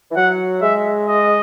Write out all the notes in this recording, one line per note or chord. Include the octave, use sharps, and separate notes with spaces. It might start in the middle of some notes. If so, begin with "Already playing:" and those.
E3
F#3 F#5
G#3 E5
D#5